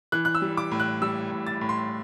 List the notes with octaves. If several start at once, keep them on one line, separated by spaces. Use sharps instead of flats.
E3 F#6
F#6
E6
G3
D6
A2
F#6
G3 E6
A2
A6
A2
C6